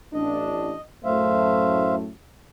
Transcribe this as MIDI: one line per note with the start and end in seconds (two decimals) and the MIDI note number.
0.14 0.72 33
0.14 0.72 62
0.14 0.81 75
1.04 2.09 42
1.04 2.09 45
1.04 2.09 57
1.04 1.95 72
1.04 1.95 76
1.04 1.95 77